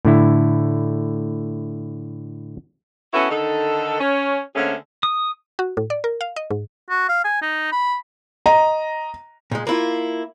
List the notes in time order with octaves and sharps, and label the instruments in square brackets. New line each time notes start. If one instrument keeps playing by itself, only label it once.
[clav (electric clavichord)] A2 D3 E4
[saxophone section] B3 C#4 E4 F#4 A4 B4
D3 D#3 D#4 A4
C#4 C#5
D3 A3 A#3 C4 C#4 G#4
[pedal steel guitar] D#6
[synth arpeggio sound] F#4
A2
D5
A#4
F5
D#5
G#2
[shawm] F#4
F5
G#5
D#4
B5
[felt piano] D#5 A#5
[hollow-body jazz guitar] A#2 G#3
A#3 E4 F4